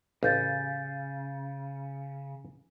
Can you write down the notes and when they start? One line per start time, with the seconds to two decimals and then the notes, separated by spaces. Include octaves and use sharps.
0.23 A1 C#3 F5 G6 A6